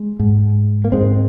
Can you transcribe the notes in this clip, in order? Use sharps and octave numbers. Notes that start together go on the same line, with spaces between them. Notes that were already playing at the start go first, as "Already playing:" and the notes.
Already playing: G#3
G#2
A#3
G#2 G#3 C4